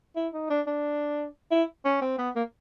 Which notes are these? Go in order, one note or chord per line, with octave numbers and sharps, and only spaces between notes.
E4
D#4
D4
D4
E4
C#4
C4
B3
A#3